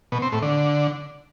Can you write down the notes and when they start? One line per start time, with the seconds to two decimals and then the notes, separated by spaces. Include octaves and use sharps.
0.12 B2
0.22 C4
0.32 A2
0.42 D3